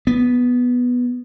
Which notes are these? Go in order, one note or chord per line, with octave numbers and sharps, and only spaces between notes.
B3